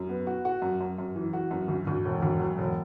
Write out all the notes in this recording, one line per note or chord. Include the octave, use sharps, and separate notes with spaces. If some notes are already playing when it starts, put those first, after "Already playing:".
Already playing: F#2
B3
F#4
F#4
F#2
F#2
F#2
E3
F#4
F#2
D2
D2
E1
D2
F#3
E1